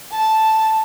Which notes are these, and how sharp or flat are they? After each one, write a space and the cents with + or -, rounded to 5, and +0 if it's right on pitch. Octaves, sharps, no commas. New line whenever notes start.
A5 +0